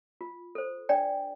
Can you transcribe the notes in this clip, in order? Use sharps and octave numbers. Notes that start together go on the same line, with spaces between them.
F4
A4 C5
D4 D5 G5